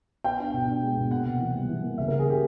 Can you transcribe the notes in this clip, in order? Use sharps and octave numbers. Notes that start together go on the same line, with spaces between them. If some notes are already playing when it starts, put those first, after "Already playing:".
B3 G5
D4
B2
D4
G#3
B2
A#3 F#5
C3
E3
G3
E3
A#3
C#3 E5
C#3 A#4
G#4
C#3 G4